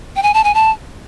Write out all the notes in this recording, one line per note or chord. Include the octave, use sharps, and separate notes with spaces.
G5
G#5
A5
G#5
A5